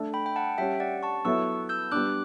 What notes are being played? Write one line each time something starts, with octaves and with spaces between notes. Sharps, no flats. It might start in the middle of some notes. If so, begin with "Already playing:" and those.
Already playing: A3 D4 A4
G5 B5
G5
F#5 A5
G3 C#4 G4 E5 G5
D5 F#5
A5 C#6
F#3 B3 E4 A4 C#6 E6
E6 G6
G3 B3 D4 D6 F#6